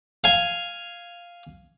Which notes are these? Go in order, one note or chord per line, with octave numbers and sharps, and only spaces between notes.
F5 G#5